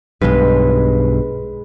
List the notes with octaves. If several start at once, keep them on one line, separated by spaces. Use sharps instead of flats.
B1 G2 G#3 B4